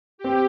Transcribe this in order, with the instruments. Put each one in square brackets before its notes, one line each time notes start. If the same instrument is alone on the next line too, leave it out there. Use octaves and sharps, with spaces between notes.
[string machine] G4
[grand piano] C4